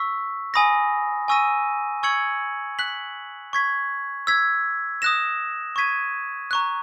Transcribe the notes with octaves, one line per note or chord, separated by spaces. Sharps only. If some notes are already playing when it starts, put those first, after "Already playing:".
Already playing: C#6 E6 B6
G#5 B5 D#6 A#6
G#5 C#6 E6 A#6 D#7
C#6 E6 G#6 C#7 F#7
F#6 B6 F#7
C#6 G#6 B6
E6 G#6 B6
D#6 F#6 A#6 E7
C#6 G#6 B6 D#7
A#5 C#6 F#6